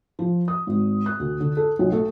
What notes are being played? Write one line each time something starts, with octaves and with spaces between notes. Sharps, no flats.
F3
D#6
G#1
F#6
D2
D3
A4
B1
A3